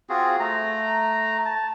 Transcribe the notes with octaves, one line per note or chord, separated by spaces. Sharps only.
C4 F4 F#4 G#4
A3 A#5
A5